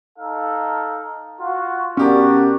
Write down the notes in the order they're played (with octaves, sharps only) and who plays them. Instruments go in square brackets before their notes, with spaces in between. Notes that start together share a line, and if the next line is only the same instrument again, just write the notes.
[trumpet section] D#4 A4 F5
F4 F#4
[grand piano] B2 G4 A#4 [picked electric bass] C#4 [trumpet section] D4 F#4 D5